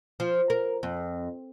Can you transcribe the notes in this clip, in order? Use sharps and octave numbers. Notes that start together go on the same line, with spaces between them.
F3
A#4
F2